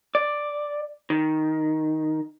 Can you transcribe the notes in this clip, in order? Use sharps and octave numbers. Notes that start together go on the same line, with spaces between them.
D5
D#3